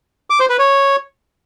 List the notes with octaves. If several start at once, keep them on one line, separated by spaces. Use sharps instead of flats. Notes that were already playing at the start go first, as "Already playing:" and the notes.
D6
C5
B4
C#5